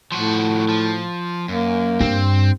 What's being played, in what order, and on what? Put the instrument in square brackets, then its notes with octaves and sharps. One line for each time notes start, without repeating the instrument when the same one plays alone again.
[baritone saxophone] A2 [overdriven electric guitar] F3 F#4
[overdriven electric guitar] F3
[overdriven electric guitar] F#2 [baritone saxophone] A#3
[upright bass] G2 [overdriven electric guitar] C4